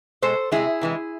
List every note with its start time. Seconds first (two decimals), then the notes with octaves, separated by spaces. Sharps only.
0.22 B2 G#3 A4 C5
0.52 C3 E3 G#3 E4 G#4
0.81 C3 E3 G#3